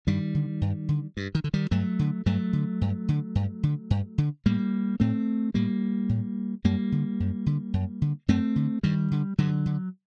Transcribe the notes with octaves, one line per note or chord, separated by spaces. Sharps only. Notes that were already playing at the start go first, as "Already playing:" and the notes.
G2 D#3 G3
D3
G2
D3
G2
D#3
D3
D#3 G3
G2 F#3 A3
D3
G2 F#3 A3
D3
G2
D3
G2
D3
G2
D3
A2 G3 A#3
A2 A3 C4
A2 G3 A#3
A2
F#2 G3 A#3
D3
F#2
D3
F#2
D3
F#2 A3 C4
D3
G2 D#3 G3
D3
G2 D3 F#3
D3